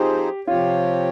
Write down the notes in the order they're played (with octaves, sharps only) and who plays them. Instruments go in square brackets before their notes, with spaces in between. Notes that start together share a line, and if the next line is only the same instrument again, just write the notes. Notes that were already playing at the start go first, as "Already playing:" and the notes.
Already playing: [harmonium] F3 C4 D#4 G#4 C5 [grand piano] G4
[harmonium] C3 F3 C4 G4 C#5 [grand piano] F4